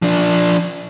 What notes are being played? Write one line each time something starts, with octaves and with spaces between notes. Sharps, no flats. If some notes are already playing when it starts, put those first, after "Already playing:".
F3 D4